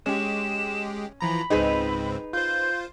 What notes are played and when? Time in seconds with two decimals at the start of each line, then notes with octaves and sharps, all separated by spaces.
0.06 G#3 C#4 G4 E7
1.21 E3 F3 A#5 B5
1.50 C#2 G#2 C4 D#4 G#4 B4
2.33 F4 C5 G6